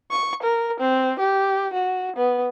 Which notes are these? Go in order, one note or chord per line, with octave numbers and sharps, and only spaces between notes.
C#6
A#4
C4
G4
F#4
B3